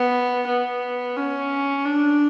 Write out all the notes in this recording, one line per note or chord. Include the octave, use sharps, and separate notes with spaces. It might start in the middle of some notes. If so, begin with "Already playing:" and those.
Already playing: B3
B3
C#4
D4